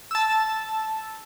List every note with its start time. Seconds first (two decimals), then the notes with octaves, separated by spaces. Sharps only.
0.11 A5 E6